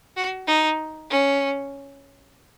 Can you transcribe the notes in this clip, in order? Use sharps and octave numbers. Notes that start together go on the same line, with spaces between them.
F#4
D#4
C#4